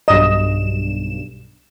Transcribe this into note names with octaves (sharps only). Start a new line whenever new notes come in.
B1 G2 D#5 E7